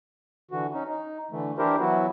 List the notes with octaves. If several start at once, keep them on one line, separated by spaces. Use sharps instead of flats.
D3 E3 F#4
C#4 D#4
D#4
D3 E3 A3
E3 D4 E4 G4 A#4 C5
E3 F#3 B3 E4 F#4